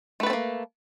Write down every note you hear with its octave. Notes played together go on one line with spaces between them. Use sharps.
A3 A#3 C4 A4 B4